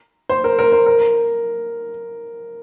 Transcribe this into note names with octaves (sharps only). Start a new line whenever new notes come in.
C5
A#4
A#4
C5
A#4